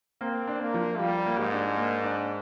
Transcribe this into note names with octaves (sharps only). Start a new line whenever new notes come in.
A#3 C4
D4
A#3
F3
G3 F4
A#3
G#2
D4
A#3
D4